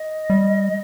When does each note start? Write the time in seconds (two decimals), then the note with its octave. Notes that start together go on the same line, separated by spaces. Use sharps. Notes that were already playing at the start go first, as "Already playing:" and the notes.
Already playing: D#5
0.30 G3